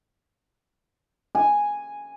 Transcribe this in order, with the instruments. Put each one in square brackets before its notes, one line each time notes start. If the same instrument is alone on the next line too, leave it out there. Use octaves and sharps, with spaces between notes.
[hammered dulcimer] G#5